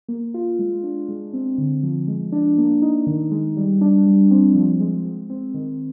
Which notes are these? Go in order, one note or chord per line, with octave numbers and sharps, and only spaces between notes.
A#3
F4
G#3
D4
G#3
C4
D3
F3
G#3
D4
A#3
D#4
D#3
G#3
G3
D4
G3
C4
F3
G#3
G#3
C4
D#3